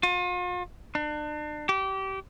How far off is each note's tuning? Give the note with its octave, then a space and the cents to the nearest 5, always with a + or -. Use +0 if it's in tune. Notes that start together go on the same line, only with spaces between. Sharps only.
F4 +40
D4 +35
G4 -25